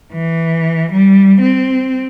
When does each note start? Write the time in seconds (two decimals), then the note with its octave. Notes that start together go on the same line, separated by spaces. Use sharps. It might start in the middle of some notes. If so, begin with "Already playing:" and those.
0.13 E3
0.92 G3
1.41 C4